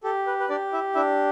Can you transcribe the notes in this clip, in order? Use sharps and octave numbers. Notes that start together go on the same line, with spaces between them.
G4 A4
B4
B4
D4 G4 D5
E4 E5
D4 E4 E5